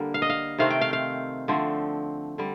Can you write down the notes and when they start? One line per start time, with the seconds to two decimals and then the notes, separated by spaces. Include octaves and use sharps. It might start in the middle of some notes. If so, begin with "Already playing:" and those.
Already playing: D3 G3 A#3
0.14 F5
0.22 D#5
0.30 F5
0.58 C3 D#3 A3 C4 F5
0.70 G5
0.81 F5
0.93 F5
1.48 D3 F3 A3 C4
2.38 D3 G3